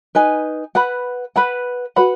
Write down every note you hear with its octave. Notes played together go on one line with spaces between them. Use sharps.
D#4 B4 G#5
B4 F#5 B5
B4 F#5 B5
F#4 B4 F#5 B5